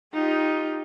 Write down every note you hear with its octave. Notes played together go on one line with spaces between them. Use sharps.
D#4 F4 G4